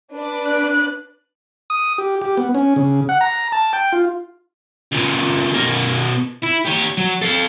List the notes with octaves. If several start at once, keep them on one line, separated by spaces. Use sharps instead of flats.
D4 B4 D5
F#6
D#6
G4
G4
B3
C#4
C#3
F#5
A#5
A5
G5
F4
C#2 A#2
B2 A#4
E4
G4 C#5
F#3
A4 F5